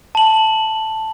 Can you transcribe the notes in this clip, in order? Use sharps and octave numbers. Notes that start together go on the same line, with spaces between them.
A5 F#7